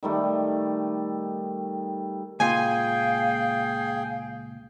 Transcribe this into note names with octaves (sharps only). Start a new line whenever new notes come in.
D#3 G3 A3
C#2 A#2 F4 G#4 F5 G5 G#5